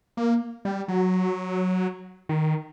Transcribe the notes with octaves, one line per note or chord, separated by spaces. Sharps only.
A#3
G3
F#3
D#3